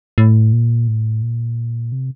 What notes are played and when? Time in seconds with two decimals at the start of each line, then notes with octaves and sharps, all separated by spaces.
0.18 A2
0.53 A#2
0.88 A2
1.22 A#2
1.92 C3